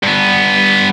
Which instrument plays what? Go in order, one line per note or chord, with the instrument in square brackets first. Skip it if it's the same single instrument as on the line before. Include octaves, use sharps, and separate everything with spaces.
[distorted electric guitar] G2 B3